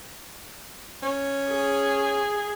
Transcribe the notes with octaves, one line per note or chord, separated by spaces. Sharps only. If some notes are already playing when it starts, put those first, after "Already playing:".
C#4
G#4